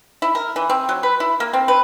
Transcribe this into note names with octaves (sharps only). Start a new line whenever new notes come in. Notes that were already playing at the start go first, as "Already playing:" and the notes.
E4
A#4
E3
C4
F#3
B4
E4
A#3
C4
B4